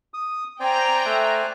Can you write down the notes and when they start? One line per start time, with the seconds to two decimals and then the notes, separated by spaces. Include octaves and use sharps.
0.14 D#6
0.60 C4 C5 D5 G5 G#5 A#5
1.06 A3 E5 F#6